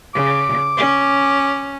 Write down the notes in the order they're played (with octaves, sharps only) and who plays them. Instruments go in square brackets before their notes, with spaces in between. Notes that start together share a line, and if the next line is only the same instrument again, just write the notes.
[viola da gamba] C#3 [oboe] D6
[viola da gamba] C#4